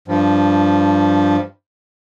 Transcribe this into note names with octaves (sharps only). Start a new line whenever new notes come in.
G2 F3